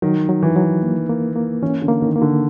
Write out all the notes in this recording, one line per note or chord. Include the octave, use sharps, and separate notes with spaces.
D#3 F#3
F#3
E3
F#3
A#3
A#3
A#3
E3 C#4
D3
A#3
D#3
A#3
D3